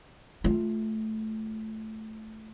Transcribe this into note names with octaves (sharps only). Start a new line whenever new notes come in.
A3 F4